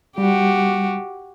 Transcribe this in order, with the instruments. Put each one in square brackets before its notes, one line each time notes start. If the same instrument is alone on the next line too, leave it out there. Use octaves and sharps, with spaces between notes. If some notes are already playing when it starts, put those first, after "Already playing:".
[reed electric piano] G3 [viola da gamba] F#4 G4